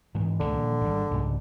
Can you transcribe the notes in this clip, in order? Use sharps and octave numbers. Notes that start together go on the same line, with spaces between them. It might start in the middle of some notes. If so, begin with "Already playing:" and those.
G#2 E3
D#1 C#2 D3
A#2 D#3 F3
G#1 G3
C2 G#2 C#3